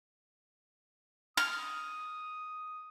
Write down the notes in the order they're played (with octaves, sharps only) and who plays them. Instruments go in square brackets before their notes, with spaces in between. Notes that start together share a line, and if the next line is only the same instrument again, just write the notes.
[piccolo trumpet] D#6 [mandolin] F6